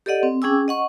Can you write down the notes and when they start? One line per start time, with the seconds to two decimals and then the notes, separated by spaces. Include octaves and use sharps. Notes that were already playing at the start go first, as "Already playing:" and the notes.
0.06 G4 A4 D5 D#5 F#5
0.23 C4
0.42 C#4 G#4 G5 G#5 D6 E6
0.68 D#5 F#5 C#6